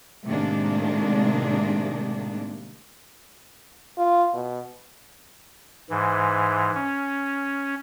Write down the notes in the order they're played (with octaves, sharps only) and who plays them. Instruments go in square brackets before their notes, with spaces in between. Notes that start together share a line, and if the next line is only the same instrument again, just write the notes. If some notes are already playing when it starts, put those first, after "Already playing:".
[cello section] A2 C3 D#3 G#3 A#3 D4
[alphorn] F4
B2
[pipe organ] G#2 E3
C#4